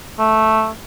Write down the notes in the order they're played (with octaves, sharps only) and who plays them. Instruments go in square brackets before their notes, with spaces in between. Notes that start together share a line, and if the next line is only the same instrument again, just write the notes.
[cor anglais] A3